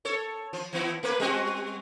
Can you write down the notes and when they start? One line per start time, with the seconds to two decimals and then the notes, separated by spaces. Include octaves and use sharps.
0.05 A4 C#5
0.53 F3
0.73 E3 B3 E4
1.03 A3 A#3 B4
1.20 G3 C4 F#4